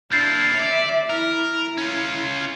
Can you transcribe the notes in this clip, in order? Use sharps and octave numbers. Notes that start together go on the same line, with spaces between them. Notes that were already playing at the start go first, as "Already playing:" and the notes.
A#3 D4 E4 G6 A6 C7
C#5 D5 E5
E4 A#4
C#4 F4